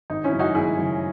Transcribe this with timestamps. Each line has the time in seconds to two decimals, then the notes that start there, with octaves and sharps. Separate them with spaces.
0.10 G#1 D#4
0.24 C#4 E4
0.32 F#2 C#3
0.39 D#4 F#4
0.55 G#1 E4 G#4
0.77 F#2 C#3